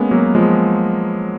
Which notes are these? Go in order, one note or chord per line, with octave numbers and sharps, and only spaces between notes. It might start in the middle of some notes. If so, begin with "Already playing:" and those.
Already playing: G#3 A#3 B3 C#4
F#3 A#3
F3 G#3